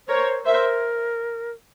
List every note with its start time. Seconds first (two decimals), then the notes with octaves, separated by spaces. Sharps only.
0.08 A#4 C5 C#5
0.46 A#4 C5 E5